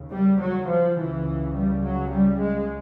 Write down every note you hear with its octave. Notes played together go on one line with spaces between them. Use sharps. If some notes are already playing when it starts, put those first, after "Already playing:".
Already playing: D#2 C#3
G3
F#3
F3
C#2 C#3 E3
G3
F#3
G3
G#3